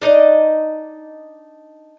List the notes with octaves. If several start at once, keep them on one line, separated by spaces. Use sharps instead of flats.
D4 D#4 D5 D#5